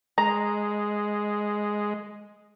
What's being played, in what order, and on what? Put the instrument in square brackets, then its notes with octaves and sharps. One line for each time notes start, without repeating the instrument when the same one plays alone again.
[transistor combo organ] G#3 [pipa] A#5